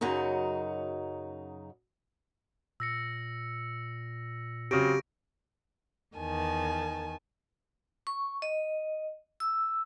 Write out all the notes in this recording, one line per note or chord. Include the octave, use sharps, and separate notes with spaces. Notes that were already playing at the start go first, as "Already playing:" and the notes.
F#2 C#3 F#3 D#4
A#2 E6 A#6 C#7
C#3 F#3 C4 G4 C#6 A#6 D7
E2 D#3 G#5 A5
C#6
D#5
E6